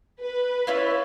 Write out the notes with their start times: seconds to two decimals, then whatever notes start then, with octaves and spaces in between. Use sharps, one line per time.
0.21 B4
0.67 C#4 E4 F4